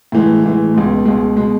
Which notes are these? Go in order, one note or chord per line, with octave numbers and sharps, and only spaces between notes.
A2 E3 G#3
A2 E3 G#3
C#2 B2 G#3
C#2 B2 G#3
B2 G#3